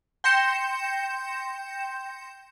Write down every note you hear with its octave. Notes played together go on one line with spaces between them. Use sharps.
G5 C6 G6 A#6 C#7 E7